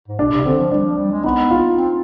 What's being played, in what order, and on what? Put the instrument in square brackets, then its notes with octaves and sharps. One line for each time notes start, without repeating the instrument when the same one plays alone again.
[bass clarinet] G#2
[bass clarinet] B2 [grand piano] D4
[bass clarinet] C3
[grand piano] D4
[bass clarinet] D3 [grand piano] C4
[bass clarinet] F3
[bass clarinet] G3 [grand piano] D4
[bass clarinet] F3
G3
G#3
[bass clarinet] B3 [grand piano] D#4
[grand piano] F4
[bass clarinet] C4